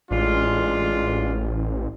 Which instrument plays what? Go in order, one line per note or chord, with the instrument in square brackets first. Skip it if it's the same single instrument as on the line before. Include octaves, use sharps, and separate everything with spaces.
[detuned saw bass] A1 [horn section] G#3 D4 F4